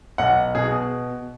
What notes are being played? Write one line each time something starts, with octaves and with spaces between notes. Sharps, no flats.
B1 F#5
B2 G#4